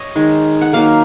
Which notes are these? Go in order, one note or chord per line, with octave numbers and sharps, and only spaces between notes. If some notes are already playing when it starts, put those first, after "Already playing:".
Already playing: C#5 D#5
D#3 G#3
F#5
D#3 F#3 A#3 F5